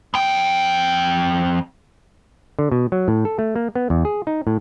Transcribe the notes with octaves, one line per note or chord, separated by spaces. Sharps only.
F2 G5
D3
B2
F#3
A2
A4
A3
A#3
B3
E2
G#4
D#4
A2